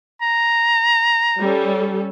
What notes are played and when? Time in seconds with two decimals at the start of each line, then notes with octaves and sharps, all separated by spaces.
0.22 A#5
1.40 G3 C#4 A4